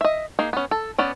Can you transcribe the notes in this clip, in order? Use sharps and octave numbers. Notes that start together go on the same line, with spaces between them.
D#5 E5
A#3 D#4 G#4
B3 C#4
A4
B3 C#4 D5